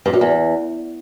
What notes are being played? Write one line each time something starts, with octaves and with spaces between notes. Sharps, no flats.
G2
F#2
E2